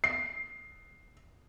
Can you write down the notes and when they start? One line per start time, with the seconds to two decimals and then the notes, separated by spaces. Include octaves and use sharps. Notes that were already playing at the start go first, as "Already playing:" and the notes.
0.04 C7